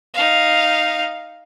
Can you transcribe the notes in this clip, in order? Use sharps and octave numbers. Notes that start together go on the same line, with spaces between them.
D#4 F5